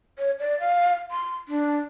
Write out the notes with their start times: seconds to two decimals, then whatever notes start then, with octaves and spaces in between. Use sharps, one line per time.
0.18 C#5
0.40 D5
0.60 F5
1.11 C6
1.48 D4